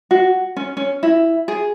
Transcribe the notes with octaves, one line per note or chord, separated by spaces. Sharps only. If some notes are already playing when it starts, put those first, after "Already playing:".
F#4
C#4
C#4
E4
G#4